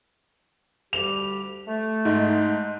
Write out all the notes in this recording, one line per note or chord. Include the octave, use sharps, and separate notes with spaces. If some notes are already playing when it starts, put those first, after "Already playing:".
D2 G3 G4 F7
A3
G#2